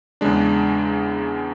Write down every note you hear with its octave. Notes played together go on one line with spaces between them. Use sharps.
E2 C#3 G#3 D4